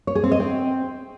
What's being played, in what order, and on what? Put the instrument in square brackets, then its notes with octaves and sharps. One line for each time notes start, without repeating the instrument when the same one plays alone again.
[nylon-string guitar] C#5
G#4
C4
D#5
C4